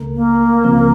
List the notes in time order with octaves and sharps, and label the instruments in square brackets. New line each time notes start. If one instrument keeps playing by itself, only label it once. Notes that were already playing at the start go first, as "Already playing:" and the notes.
Already playing: [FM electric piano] C#2 C#3 A3 A#4
[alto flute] A#3
[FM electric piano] C#2 C#3 F3 C4